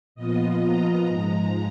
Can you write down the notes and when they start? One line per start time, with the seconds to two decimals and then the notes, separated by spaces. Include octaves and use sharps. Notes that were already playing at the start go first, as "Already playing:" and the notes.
0.15 A#2 F3 B3 F4 D#5
0.60 A#5
1.05 G#2 F3 G#3